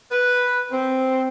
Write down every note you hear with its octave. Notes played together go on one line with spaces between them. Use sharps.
B4
C4